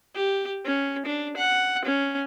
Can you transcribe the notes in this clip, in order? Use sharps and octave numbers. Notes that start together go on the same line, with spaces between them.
G4
C#4
D4
F#5
C#4